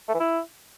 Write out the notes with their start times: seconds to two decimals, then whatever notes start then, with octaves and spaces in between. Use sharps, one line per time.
0.09 A3
0.14 E3
0.20 E4